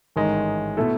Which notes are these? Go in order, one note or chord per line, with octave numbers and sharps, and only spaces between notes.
A1 G#2 D#3 G#3 D#4
B2 A3 E4 A4